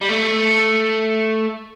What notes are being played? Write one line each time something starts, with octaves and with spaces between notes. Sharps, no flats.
G3
A3